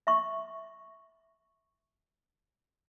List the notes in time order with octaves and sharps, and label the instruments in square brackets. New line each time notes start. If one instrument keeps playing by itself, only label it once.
[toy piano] E5 C#6